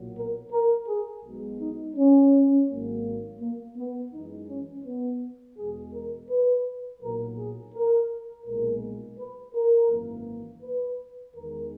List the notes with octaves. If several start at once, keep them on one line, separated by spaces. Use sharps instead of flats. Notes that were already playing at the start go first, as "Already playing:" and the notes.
Already playing: B1 A#2 F#3
A#4
A#4
G#4
B1 B2 G#3
D#4
C#4
G#1 G#2 F#3 A#3
A#3
B3
F#2 E3 G#3 D#4
C#4
B3
E2 B2 G#3 G#4
A#4
B4
B1 A#2 F#3 A#4
G#4
A#4
B1 A#2 G#3 A#4
B4
A#4
G#1 F#2 E3 A#3
B4
E2 D#3 G#3 A#4